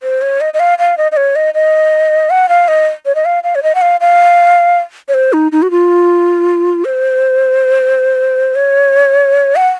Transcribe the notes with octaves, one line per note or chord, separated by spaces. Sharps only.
C5
C#5
D#5
D#5
F5
F5
D#5
D#5
C#5
D#5
D#5
F#5
F5
D#5
C#5
D#5
F5
F5
C#5
D#5
F#5
F5
F5
C#5
C5
D#4
D#4
F#4
F4
C5
C#5
F#5